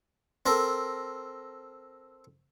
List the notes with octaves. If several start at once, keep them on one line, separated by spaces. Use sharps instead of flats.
C4 A4 A#4